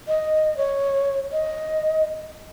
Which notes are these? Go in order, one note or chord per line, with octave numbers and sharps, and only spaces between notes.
D#5
C#5
D#5